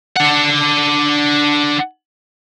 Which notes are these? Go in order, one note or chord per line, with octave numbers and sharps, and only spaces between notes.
D4 F#5